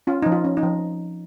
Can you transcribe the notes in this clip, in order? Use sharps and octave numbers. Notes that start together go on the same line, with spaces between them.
C#4 F4
F3 D#4
F4
C#4
D#4
F3